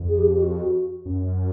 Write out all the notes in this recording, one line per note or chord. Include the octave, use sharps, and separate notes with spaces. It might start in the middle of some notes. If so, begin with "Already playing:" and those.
Already playing: F2
G#4
G4
G4
F#4
F#2